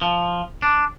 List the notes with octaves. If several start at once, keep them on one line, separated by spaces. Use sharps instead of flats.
F3
D4